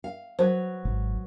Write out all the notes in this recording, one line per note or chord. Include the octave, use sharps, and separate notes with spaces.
F5
F#3 B4 C5
G#1